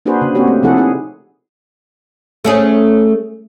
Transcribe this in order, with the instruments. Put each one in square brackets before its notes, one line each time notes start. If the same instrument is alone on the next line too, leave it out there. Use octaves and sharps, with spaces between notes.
[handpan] A#3 D4 F#4 G#4 B4 C5
C#3
A#3 C4 F#4 G4 C#5
A3
C3 F3 E4 G#4 A4 F#5
D#4 G#4
[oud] A3 C#4 G#4